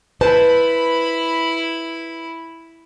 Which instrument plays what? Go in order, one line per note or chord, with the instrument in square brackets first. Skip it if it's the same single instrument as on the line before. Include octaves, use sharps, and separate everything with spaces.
[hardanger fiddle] E4 B5 [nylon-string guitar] B4 C5 A5